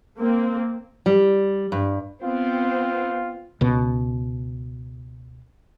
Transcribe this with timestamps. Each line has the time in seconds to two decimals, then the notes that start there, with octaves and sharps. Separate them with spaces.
0.18 A#3 C4
1.06 G3
1.72 G2
2.23 B3 C4 F4
3.61 C#2 B2